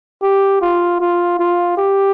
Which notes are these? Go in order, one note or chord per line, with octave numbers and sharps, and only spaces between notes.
G4
F4
F4
F4
G4